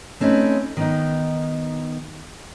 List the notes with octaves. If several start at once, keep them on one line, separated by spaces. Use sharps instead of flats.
A3 C4 C#4 D#4 A#4 B4
D#3 B3 D#4